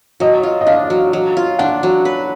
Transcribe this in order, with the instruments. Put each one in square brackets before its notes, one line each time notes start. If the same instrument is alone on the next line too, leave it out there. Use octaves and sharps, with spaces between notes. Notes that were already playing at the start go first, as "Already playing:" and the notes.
[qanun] F#3 [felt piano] D#5
[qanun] F4
[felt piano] D#5
[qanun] D4 [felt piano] F5
[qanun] F#3
F#3
F4
[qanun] D4 [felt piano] F#5
[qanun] F#3
B4